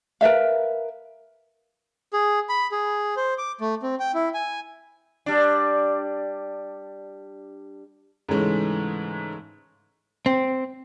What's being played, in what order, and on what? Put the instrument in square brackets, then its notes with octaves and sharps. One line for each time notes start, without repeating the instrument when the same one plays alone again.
[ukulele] A#4 B4 E5 F5
[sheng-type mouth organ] G#4
B5
G#4
C5
D6
A3
C4
G5
E4
G#5
[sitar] G3 D4
[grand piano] G#2 C#3 E3 G#3 A3 C#4
[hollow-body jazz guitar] C4